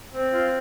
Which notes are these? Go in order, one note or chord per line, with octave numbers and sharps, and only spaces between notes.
C4
F4